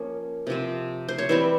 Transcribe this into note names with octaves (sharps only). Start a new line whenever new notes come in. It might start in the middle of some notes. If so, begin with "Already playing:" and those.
Already playing: F3 A#3 C#4 C#5
C3 F3 C4
C5
C#5
E3 G3 C4 E5